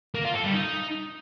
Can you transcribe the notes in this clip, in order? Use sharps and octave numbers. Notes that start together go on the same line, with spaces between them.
A#3
F4
A4
G3
D#4